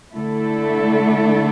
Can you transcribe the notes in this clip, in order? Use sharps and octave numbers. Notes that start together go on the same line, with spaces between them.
D3 A3 E4 A4